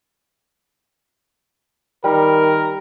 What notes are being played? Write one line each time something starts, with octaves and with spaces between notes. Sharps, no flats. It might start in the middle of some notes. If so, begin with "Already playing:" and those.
D#3 G3 A#4